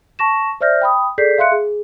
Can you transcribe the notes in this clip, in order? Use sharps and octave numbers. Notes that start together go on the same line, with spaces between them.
A5 C#6 A#6 E7
C5 D5 E5 F6 G6 A#6
G5 B5 D#6
G#4 A4 D5 G6 B6 C7
E5 F5 C6 F#6 C#7
G#4